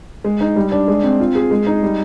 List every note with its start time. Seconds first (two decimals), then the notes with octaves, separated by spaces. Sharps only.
0.24 G#3
0.41 D#4
0.56 G3
0.72 D4
0.88 G#3
1.03 C4
1.20 F4
1.35 G#4
1.51 G#3
1.67 D#4
1.83 G3